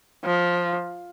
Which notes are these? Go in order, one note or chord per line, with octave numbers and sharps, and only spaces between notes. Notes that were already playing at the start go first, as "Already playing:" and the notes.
F3